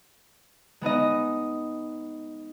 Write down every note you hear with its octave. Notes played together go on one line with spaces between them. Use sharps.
G#3 B3 D#4 D#5